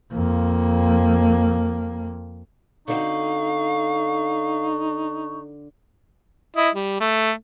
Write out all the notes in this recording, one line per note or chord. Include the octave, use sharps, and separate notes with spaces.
F2 A#3
D3 C4 D#4 F#4 F5 C#6
E4 D#5
G3
A3